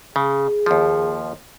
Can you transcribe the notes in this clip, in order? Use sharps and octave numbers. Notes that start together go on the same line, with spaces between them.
C#3 G#4
D#2 F3